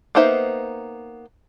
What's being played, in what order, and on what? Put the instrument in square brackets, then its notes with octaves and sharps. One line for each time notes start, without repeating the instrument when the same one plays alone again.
[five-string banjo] A#3 B3 D#4 C5 E5